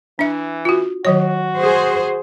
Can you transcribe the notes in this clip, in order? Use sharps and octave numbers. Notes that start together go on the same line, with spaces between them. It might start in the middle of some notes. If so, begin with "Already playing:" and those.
E3 D4 E5
F4 F#4
D#3 F#3 F#4 C#5
G#4 C5